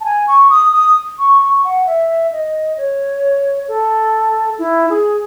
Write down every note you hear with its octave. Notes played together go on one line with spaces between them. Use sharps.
A5
G#5
C#6
D#6
D#6
C#6
C#6
F#5
E5
D#5
C#5
A4
E4
G#4